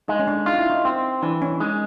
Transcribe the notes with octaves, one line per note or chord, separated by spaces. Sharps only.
G#3 D#4
C#4
D4
D#4 F4
E4
D#4
C4
E3 D4
C#4
G#3 D#4